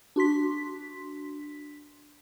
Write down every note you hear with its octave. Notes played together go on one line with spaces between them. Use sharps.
D4 F#4 C6 B6